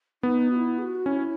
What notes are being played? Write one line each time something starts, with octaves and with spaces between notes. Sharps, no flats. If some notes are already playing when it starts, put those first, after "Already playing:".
B3 D#4
F#4
E4
G#4
F#4
C#4 E4